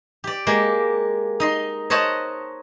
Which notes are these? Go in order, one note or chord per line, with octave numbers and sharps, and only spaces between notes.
G4 D5
G#3 A#3 G4
D#4 D#5 C6
C5 C#5 D#5 F#5 A5